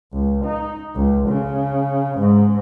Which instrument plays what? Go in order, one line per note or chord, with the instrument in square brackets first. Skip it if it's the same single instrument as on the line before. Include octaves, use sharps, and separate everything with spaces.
[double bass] C#2
D#4
C#2
C#3
G#2